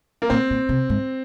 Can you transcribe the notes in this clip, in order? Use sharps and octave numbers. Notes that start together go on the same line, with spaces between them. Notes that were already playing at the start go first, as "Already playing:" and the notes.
A#3
A#2 C4
A#2
C3
G#2